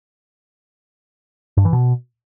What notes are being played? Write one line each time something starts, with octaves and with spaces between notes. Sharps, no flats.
G2
E3
B2